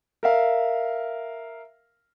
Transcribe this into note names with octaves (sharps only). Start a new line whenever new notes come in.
A#4 E5 F5